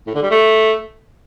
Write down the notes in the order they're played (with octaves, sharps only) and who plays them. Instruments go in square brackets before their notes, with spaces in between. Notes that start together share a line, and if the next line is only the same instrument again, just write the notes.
[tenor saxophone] A2
D3
G3
A3